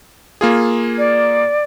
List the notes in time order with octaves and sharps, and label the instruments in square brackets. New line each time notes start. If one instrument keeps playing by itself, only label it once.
[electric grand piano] A#3 F4 G#4
[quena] D5